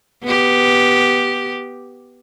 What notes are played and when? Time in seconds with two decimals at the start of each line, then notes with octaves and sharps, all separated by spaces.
0.23 B3 G4